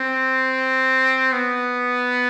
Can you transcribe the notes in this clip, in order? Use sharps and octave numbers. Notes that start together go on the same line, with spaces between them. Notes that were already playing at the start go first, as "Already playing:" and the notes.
Already playing: C4
B3